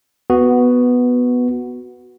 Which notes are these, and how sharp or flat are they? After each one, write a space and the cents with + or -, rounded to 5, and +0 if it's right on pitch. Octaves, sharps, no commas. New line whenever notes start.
B3 +0 F#4 +0